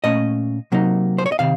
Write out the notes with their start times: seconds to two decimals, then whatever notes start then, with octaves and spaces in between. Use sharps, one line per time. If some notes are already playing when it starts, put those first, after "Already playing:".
0.04 A#2 A3 C#4 D#5
0.72 C3 F#3 A#3 D#4
1.18 C5
1.26 C#5
1.32 D#5
1.39 C3 D#3 F5